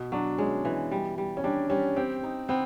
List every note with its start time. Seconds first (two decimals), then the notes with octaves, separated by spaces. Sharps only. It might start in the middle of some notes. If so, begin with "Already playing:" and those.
Already playing: B2
0.12 F#3 D4
0.38 G#3 C#4
0.65 E3
0.91 G3
1.18 G3
1.37 C#4
1.44 G3 D4
1.70 G3 C#4
1.96 C4 G4
2.23 D#4
2.49 B3 C4